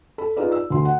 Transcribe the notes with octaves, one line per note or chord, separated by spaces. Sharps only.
A4 B5
D#4 F4 G#4 B4 D5
E6
D2 C6
F#5